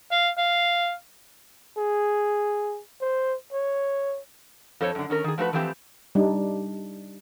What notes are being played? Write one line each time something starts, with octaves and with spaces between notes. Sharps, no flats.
F5
F5
G#4
C5
C#5
F2 A4 C5 C#5
F#2 D3
D#3 C#4 A#4
D#3 G#4
F3 A3 F#4 A#4 B4
E3 F3 A3 C4 G4 B4
G3 D4 D#4